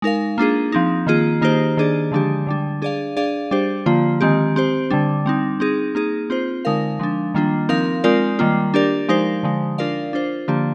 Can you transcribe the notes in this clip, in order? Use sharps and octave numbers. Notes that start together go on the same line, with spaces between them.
G#3 D#4 A#4 F5
A#3 D4 F4 G#4
F3 C4 D#4
D#3 A#3 F4 G#4
D#3 A#3 D#4 G4 C5
D#3 A#3 D4 G#4 D5
D3 F3 G#3 D4 G4
D3 G3 D4
D4 G#4 D5 F5
D4 G#4 D5 F5
G3 D4 G4 C5
D3 F3 A#3 F4
D#3 G#3 C4 G4
C4 G4 C5
D3 G3 D4
G3 C4 D#4
C4 D#4 G#4
A#3 D#4 G#4
C4 F4 C5
D3 G#3 D#4 A#4 F5
F3 G#3 D4
D#3 G3 A#3 D4 F4
F3 C4 D#4 A#4 F5
G#3 C4 F4 A#4 D5
D#3 G3 A#3 F4
D4 G4 A#4 D5
F3 G#3 D#4 G4 C5
D3 F3 G#3
D4 F4 A#4 D5 F5
D4 F4 C5
D3 F3 A#3 D4 G4